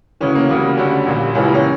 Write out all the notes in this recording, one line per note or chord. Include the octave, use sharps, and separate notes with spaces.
D2 C#3 E3 C#4
A#3
D2 C#3 G3 A#3
D2 D3 G3 C#4
A#1 A#2 G3
C#2 C#3 E3 G3 C#4
A#3
C#4